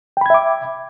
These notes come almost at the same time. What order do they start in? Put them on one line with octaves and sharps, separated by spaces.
G5 B5 G#6 E5 D6